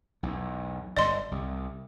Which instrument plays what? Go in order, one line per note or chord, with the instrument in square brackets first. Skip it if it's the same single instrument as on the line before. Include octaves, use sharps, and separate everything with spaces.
[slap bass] B1 E2
[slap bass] G1 [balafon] D5 D#5 C6
[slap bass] C2